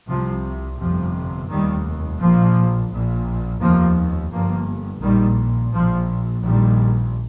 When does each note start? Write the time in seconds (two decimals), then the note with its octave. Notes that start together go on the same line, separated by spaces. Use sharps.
0.08 C2 C3 F3
0.79 G1 F2 C3 F3
1.50 F1 D#2 D#3 G3
2.20 A#1 A#2 F3 A#3
2.91 A#1 A#2
3.60 F1 D#2 F3 A#3
4.31 G1 G2 F3 A#3
5.01 A#1 A#2 D#3 G3
5.72 A#1 A#2 F3
6.42 A#1 A#2 D#3 G3